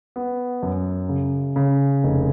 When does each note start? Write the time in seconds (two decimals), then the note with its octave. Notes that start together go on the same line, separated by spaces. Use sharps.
0.16 B3
0.63 F#2
1.09 C#3
1.56 C#3
2.04 F1